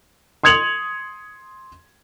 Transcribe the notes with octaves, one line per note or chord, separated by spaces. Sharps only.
C6 D#6 G#6 C#7 F7 F#7